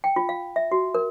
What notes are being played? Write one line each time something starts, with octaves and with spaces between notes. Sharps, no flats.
G5
F4
F5
E5
F#4
A#4